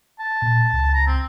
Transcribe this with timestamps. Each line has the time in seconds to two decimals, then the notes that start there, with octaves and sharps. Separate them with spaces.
0.20 A5
0.42 A#2
0.73 C#2
0.94 A#5
1.07 C4